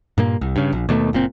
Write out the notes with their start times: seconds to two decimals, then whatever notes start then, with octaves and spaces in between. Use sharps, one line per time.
0.18 G2 A#2 A#3
0.41 C2
0.56 G2 C#3
0.73 A#1
0.89 D#2 B2 F3 A3
1.13 F#1 A#2 C4